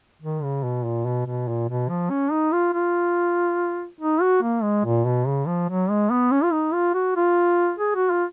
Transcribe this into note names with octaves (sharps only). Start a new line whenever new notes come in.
D#3
C#3
B2
A#2
B2
B2
A#2
B2
F3
C#4
D#4
F4
F4
D#4
F#4
A#3
G#3
A#2
B2
C#3
F3
F#3
G#3
B3
C#4
F4
D#4
F4
F#4
F4
G#4
F#4
F4